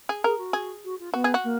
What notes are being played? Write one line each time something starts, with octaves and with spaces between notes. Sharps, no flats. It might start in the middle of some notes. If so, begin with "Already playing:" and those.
G#4
G#4 A#4
F#4
G#4
F#4
F4
B3 F#4
G#4
F#4
A#3